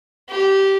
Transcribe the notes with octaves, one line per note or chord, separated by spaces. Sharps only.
G4